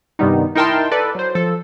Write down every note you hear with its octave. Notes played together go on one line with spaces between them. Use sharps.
G2 C3 D#3 G3 B3 D#4
D#4 E4 A#4 G5 A5 C6
A4 B4 D5
F#3 C5
F3 A4